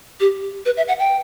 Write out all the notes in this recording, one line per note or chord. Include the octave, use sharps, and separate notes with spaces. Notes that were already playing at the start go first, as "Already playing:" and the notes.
G4
B4
E5
F#5
G5